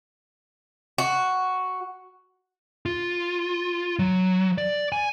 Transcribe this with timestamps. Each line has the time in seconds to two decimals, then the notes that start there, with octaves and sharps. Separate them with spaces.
0.98 F#4
2.86 F4
3.99 F#3
4.58 D5
4.92 G#5